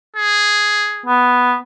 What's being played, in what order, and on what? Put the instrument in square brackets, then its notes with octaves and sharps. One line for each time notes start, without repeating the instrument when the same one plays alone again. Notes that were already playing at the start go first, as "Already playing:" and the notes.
[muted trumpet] G#4
[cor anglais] B3